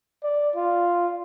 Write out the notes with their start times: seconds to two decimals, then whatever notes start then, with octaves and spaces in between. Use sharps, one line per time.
0.24 D5
0.55 F4